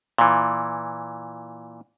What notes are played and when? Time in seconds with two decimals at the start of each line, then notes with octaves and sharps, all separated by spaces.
0.18 A#2 E3